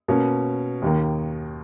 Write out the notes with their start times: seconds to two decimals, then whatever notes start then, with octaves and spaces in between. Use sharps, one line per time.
0.08 B2 A#3 C#4
0.82 D#2 D#3 A#3